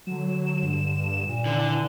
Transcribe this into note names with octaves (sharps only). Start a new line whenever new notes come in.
D3 F#3 E7
G2
A#2
D3 E3